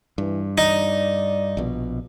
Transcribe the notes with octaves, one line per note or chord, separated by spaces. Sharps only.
G2 E3
D#4 D5
A#1 B2